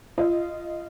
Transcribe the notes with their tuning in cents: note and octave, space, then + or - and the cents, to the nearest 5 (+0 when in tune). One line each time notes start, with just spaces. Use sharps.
F4 -25 D#5 +0